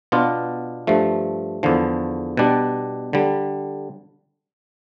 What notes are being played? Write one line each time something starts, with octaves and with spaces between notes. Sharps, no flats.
B2 B3 D4 F4
G2 F3 A3
E2 D3 F3
B2 G3 D4
D3 G3